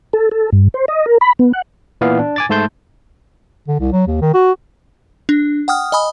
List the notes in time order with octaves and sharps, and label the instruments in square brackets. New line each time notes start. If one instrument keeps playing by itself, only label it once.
[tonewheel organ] A4
A4
G2
C5
D#5
A#4
B5
B3
F#5
[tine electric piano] A#2 E3 B3 F5
D4
G#5 D6 A6
G#2 A3 A5 C6 G6
[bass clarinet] D3
C2
F#3
D#2
D#3
F#4
[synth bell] D4
F#5 G5 D#6 F6
D#5 G#5 B5 D#6